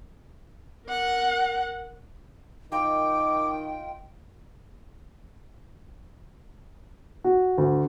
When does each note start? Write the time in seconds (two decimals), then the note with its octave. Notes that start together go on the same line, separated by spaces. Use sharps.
0.88 A#4 F#5
2.72 D#3 F4 A#4 D#5 G5 D6
7.24 F#4
7.58 D2